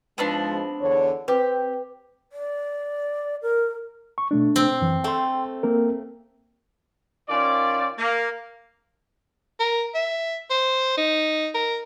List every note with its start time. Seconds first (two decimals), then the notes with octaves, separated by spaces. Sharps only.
0.18 G#2 F3 G#3 B3 C4 D4
0.80 E2 D3 C#5
1.28 C4 G4 B4 D6
2.32 D5
3.42 A#4
4.18 C#6
4.31 B2 A3 D4
4.56 C4
4.81 F#2 E3
5.04 A3 G5 C6
5.63 A#3 C4 A#4
7.28 D#3 C#4 F4 D5
7.98 A#3
9.60 A#4
9.94 E5
10.50 C5
10.97 D#4
11.54 A#4